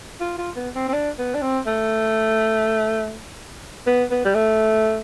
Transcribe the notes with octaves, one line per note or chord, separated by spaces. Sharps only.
F4
F4
B3
C4
C4
D4
B3
D4
C4
A3
B3
B3
G3
A3